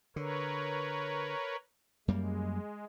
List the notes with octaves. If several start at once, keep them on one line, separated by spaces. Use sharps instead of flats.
D3 A#4 B4 C#5
F#2 G3 G#3 A#3